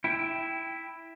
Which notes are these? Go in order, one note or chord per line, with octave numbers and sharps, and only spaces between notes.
E4 G5